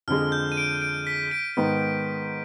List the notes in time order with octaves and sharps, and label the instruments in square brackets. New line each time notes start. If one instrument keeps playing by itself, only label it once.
[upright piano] F2 [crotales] F6
[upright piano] D3 G#3
[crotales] G6
D#7
D7
D7
B6
D7
[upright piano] G#2 D#3 B3